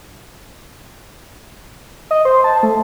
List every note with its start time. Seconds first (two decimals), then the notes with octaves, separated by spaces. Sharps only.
2.11 D#5
2.25 C5
2.44 A5
2.63 A3